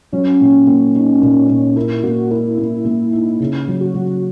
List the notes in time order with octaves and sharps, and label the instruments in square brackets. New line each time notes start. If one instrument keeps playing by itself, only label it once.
[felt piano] F#3 [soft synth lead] C#4
[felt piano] A#2
A#3
D#4
A#2
A#2
[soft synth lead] E4 [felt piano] A#4
[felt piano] A#3 [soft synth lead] F#4
[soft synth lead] E4 [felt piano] A#4
[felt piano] A#3
A#3
D#4
C#3
F#3
[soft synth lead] F#4
[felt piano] F#3